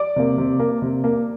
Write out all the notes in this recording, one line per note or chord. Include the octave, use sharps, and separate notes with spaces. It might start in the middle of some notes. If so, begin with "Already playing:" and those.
Already playing: D5 D6
C3 A#3
C3
A#3
C3
A#3